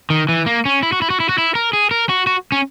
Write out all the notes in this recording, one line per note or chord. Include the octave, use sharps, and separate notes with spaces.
D#3
E3
A#3
C#4
E4
F#4
E4
F#4
E4
F#4
E4
A#4
G#4
A#4
F#4
F#4
C#4